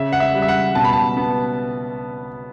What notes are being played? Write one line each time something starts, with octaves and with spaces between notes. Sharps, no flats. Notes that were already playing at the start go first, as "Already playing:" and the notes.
Already playing: C#3 E5
F#5
E5
G3
E5
F#5
B2 A5
B5
A5
B3